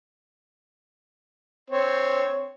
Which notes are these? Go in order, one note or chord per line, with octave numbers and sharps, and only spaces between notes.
C4 C#5